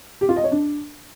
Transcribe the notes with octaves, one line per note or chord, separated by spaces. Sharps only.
G4
F4
D#5
C#5
D4